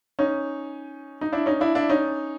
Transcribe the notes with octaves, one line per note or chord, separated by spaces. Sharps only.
C#4 D#4
D#4
D4 E4
C#4 D#4
D4 E4
D4 E4
C#4 D#4